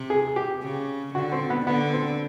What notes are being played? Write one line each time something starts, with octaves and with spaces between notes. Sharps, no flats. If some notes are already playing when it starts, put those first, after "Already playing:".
Already playing: C3
G#4
G4
C#3
D3 F#4
C4
B3
D3 B3
C4